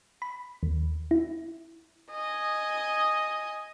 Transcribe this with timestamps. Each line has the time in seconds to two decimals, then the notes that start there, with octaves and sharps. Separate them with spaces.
0.22 B5
0.63 D#2
1.11 E4
2.11 D#5 G#5